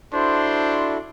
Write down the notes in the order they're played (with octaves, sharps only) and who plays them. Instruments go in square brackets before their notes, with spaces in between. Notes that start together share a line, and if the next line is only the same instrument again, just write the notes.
[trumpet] D4 [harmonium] E4 F#4 A4 [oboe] C5 [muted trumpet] C6